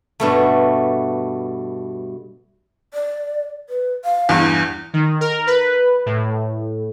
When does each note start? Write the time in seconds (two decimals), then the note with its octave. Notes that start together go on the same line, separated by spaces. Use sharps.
0.20 G2 B2 A3
2.94 D5
3.69 B4
4.04 F5
4.29 E2 G2
4.93 D#3
5.21 A#4
5.47 B4
6.06 A2